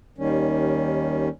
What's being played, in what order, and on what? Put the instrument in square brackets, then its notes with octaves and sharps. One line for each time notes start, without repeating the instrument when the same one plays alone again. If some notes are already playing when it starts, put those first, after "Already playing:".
[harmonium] D#2 D#3 G3 C#4